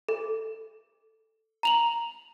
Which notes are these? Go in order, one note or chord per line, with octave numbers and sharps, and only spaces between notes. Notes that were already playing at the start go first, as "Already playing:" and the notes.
A4
A#5 F7 F#7